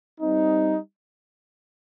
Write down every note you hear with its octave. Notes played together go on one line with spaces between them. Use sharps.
G3 C4 D#4